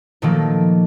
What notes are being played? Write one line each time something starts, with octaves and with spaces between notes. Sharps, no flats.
A#2 D#3 F3 F#3 A3 A#3